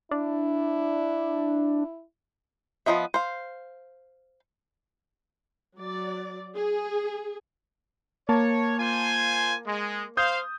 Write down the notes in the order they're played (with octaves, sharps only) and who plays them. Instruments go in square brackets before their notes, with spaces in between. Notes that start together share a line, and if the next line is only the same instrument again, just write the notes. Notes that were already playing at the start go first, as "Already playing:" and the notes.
[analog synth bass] D4 [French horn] E4
[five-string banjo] F3 B3 E4 D#5 E5
C5 F5
[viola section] F#3 D5
G#4
[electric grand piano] A#3 A5 [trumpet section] C#5
[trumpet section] F4 C5 G#5
G#3
[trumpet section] C5 F5 [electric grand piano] D#6 G6